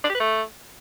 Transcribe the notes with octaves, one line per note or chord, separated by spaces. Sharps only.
D4
G4
B4
A3